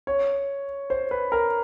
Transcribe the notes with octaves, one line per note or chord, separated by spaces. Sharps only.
C#5
C5
B4
A#4